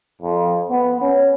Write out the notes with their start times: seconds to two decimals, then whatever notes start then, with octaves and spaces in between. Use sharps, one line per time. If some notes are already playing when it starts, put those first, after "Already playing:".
0.22 F2
0.70 B3
1.01 C#4